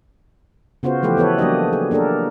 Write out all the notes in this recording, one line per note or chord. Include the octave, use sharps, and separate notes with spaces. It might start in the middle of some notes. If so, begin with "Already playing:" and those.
C#3 B3 F4 F#4 C5
E3 F3 A3 G4 B4
E3 B3 A4 B4 C#5
F#3 A#3 D4 G4 D#5
G#4
A#3 D4 G4 A4 A#4